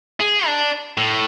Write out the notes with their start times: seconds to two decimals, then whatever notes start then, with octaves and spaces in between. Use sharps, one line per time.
0.20 G#4
0.46 D4
0.98 A2